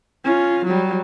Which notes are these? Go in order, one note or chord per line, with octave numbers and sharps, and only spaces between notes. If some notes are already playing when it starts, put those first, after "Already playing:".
C#4 F4
F#3 G3